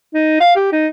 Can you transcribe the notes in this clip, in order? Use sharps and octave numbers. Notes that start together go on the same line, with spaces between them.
D#4
F5
G4
D#4